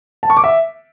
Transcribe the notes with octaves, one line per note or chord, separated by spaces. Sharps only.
A5
C#6
D6
E5